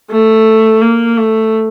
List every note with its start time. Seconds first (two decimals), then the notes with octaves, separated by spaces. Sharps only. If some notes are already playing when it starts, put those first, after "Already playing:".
0.11 A3
0.81 A#3
1.17 A3